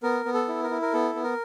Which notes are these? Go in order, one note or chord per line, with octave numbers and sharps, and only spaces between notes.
B3 A#4
B3
A4
E4
A#4
E4
A#4
B3 A4
B3
A#4